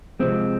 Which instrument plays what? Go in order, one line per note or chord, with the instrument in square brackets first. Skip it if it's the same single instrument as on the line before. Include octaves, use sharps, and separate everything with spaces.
[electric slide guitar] C3 F3 G#3 C4